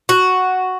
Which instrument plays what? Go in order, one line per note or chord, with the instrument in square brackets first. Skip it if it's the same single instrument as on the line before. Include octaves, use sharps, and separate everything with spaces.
[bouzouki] F#4